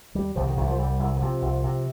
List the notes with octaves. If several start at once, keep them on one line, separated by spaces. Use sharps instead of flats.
D#2 G3
C2 F3
D#3
C2 D#3
F3
C2 G3
C2
D#3
C3 F3
C2
C3